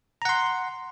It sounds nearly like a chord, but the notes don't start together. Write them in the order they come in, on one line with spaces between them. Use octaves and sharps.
A#5 F#5 C6